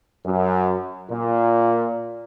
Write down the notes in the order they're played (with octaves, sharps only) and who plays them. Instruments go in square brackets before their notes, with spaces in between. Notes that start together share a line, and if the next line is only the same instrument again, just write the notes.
[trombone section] F#2
A#2